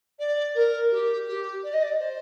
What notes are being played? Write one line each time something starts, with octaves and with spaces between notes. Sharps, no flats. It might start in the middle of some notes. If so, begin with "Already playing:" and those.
D5
A#4
G4
G4
D5
D#5
D5
C5